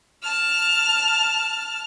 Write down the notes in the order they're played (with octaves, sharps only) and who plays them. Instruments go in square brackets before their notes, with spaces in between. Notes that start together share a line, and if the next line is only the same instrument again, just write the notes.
[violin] A5 F6